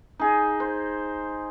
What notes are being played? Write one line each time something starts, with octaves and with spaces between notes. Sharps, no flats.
D#4 G#4
C5